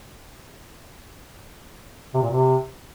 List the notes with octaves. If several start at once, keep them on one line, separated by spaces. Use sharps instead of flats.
C3
A#2
C3